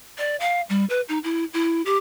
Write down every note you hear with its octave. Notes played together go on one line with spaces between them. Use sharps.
D5
F5
G3
B4
D#4
E4
E4
G4